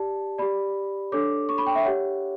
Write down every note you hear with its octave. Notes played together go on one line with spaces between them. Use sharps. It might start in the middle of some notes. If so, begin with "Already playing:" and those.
Already playing: G4 D5 A5
G4 D5 B5
D4 A4 C#5 D6
C#6
B5
G5
E5
G4 C#5 F#5